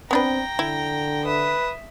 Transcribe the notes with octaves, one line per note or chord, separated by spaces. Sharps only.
B3 C4 D4 B4 G5 A#5
D3 E4
B4 E5 D#6